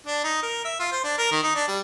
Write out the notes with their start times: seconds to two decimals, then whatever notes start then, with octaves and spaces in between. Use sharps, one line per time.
0.07 D4
0.24 D#4
0.43 A#4
0.65 E5
0.79 F4
0.92 C5
1.04 D4
1.18 A#4
1.32 D#3
1.43 D#4
1.56 D4
1.68 G3